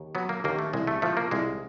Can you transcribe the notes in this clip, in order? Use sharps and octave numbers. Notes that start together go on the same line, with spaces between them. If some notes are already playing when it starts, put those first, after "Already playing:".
Already playing: D#2
F#3 B3
A#3
D#2 A#3
A3
C2 G#3
A3
F3 A3
A#3
C2 G#3